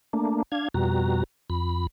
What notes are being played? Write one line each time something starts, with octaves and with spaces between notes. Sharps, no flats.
A3 A#3 D4
D4 F5 G#6
F2 B2 G3 F#4 A#5
F2 B5